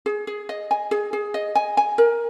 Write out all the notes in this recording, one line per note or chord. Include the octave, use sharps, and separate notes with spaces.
G#4
G#4
D#5
G#5
G#4
G#4
D#5
G#5
G#5
A#4